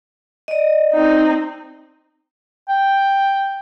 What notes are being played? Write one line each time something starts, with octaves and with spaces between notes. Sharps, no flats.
D5 D#5
C4 D#4
G5